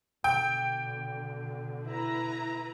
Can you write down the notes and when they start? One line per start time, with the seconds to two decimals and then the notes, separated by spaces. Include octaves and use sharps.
0.24 B2 D3 G5
1.87 E4 B4 A#5